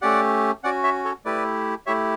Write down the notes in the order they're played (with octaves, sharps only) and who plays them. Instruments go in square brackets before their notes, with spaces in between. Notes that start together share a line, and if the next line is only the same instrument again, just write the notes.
[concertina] A3 C#4 G4 D5 F#5
C#4 F#4 D5 F#5
C#5 E5
A4 C#5
A3 E4 G4 B4 D5
A3 E4 G4 C#5 E5